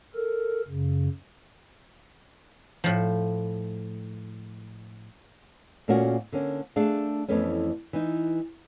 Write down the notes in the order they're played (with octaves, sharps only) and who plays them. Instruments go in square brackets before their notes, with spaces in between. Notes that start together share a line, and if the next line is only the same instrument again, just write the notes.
[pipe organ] A4 A#4
F#2 C#3
[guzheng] A2 F3
[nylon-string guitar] A#2 A3 A#3 C#4 F4 F#4
D3 A#3 C#4
A3 D4 G#4 F5
F2 E3 A3 B3 C#4
E3 D#4